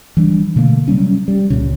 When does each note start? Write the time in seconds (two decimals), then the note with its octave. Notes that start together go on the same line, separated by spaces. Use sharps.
0.17 E3 G3 D4
0.56 B2 D3 A3 A#3
0.88 C3 F#3 G3 C#4
1.28 G3
1.50 C#2 A#2 C#3